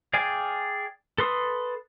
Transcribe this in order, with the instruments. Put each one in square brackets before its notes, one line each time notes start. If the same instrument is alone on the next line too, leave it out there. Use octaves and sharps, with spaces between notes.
[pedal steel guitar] G#4 D5 F5 G5 G#5
A4 B4 C6 D#6